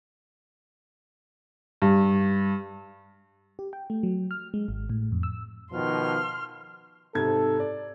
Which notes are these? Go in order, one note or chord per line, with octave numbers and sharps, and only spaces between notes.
G2
G4
G5
A3
F#3
F6
G#3
G#1
A2
F2
E6
B2 D#3 F3 C6 F6
G#2 C3 A4 G#6
D5